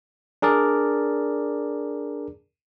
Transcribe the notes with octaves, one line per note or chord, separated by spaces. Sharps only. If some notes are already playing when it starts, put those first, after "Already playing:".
D4 G#4 A#4 D5